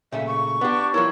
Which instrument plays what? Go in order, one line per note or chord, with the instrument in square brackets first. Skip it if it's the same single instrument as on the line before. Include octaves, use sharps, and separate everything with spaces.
[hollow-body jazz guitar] A#2 C#3 A3 [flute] E5
[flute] C#6
[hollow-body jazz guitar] B3 G4 [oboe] D4
[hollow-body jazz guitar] F3 E4 [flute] A#4 [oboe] C#5